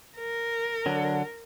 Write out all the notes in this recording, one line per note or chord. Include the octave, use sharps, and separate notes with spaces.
A#4
D3 F#3 D4